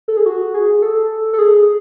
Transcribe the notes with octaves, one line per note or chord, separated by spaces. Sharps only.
A4
G#4
F#4
G#4
A4
A4
G#4